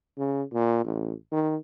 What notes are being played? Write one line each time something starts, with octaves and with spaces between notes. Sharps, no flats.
C#3
A#2
A1
D#3